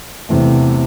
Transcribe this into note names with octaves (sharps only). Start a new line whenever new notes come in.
E2 C3 E3 A3